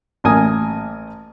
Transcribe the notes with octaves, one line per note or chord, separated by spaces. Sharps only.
A1 A#3 G#5 D#6